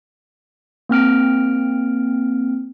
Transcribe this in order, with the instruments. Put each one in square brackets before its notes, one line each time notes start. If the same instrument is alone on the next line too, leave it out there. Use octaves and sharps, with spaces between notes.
[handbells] A#3 C4 F6 D7